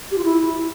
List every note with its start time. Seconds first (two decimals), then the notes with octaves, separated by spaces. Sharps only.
0.11 G4
0.18 F4
0.25 E4